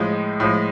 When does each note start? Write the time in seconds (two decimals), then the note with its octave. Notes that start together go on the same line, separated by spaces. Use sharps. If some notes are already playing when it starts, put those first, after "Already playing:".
Already playing: A2 F3 G#3
0.40 A2 F3 G#3